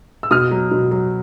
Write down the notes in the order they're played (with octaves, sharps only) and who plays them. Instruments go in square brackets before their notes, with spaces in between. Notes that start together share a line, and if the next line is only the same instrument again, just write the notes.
[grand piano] E6
B2 D#6 F6
F#3
B2
F#3